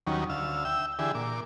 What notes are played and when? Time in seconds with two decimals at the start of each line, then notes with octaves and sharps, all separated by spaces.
0.07 D#2 D#3 F#3 G3 C#4
0.30 D2 F5 E6
0.65 E5 G5 E6
0.99 D3 E3 G4 G#4 E5
1.15 A#2 D6